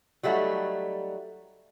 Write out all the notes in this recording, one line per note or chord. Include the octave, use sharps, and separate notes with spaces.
F#3 G3 A3 D#4 F#4